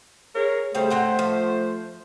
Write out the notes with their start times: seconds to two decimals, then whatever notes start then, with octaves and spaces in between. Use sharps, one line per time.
0.35 G#4 A#4 C#5
0.75 C#3 G3 A3 C5
0.90 D3 C4 F#5
1.19 F3